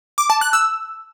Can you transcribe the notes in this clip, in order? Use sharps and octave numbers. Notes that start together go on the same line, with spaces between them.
D6
A5
F#6
E6